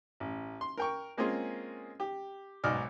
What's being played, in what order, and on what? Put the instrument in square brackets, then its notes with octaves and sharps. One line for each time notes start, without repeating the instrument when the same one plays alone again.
[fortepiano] A1
C6
A#4 G5 C#6
G#3 A#3 C4 C#4 F4 G#4
G4
B1 G#2 F#4 D5 D#5 F6